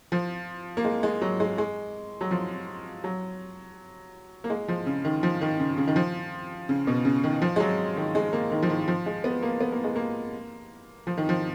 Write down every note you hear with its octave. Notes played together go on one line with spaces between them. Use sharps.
F3
A#3
G#3
G#3
F#3
G#3
G#3
F#3
F3
F#3
A#3
G#3
F3
C#3
D#3
F3
D#3
C#3
C#3
D#3
F3
C#3
B2
C#3
D#3
F3
G#3
F#3
D#3
G#3
A#3
D#3
F3
D#3
F3
G#3
B3
A#3
B3
A#3
G#3
A#3
F3
D#3
F3